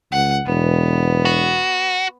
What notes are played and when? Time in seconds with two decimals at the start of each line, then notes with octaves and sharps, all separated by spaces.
0.12 C#2 F#5
0.46 E1 B3
1.25 F#4